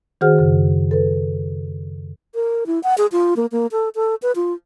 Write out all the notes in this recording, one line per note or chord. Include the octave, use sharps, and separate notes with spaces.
D#3 F#4 G#4 C5 F#5 F6
F#2 C#3
A4 B4
A#4
E4
F#5
G#4
F4
A#3
A#3
A4
A4
B4
F4